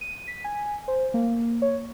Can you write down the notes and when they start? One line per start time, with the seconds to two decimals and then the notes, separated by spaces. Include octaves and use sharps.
0.01 D#7
0.28 B6
0.44 G#5
0.88 C5
1.14 A#3
1.62 C#5